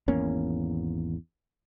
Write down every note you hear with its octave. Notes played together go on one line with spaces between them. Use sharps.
G#1 E2 A#3 C#4